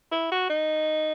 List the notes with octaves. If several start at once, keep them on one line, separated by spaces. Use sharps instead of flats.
E4
F#4
D#4